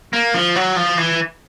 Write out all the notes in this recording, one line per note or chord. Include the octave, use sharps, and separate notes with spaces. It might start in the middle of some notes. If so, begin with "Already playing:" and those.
A#3
F3
F#3
F3
E3